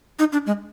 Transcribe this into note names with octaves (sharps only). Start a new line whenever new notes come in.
D#4
D4
G#3